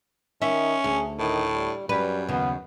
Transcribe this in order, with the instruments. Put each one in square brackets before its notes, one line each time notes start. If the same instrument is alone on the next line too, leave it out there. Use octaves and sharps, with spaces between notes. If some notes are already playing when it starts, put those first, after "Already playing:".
[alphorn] D#3 [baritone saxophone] C#4 [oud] E5
[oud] D2 [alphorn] G#4
[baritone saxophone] A2 [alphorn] D#3
[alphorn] G3
[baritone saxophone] F#2 [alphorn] G3 [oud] B4
[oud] D#2 C#3 [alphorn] B3